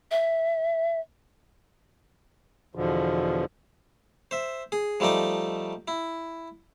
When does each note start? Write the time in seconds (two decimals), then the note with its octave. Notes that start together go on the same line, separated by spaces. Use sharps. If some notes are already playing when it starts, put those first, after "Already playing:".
0.11 E5
2.75 E2 B2 D3 F3
4.31 C5 E5
4.72 G#4
5.00 F3 G3 A3 D#4 D5
5.88 E4